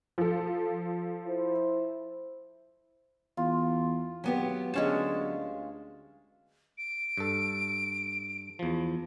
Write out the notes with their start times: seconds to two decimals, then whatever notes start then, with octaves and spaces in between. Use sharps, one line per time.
0.18 F3 A4
1.26 E4 C5
3.37 E2 F4
4.24 G#1 F#3 B3 G4
4.74 D2 G#3 C#4 A5
6.78 D7
7.17 G2 A4
8.59 E2 F3